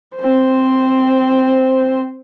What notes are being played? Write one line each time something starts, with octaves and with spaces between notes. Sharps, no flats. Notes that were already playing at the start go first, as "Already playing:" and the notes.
C4 C5